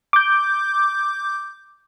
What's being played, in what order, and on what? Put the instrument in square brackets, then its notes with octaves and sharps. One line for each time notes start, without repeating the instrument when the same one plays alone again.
[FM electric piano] D6 G6